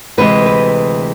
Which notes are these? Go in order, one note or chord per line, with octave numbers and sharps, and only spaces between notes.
D2 C3 E3 G#3 B4
B4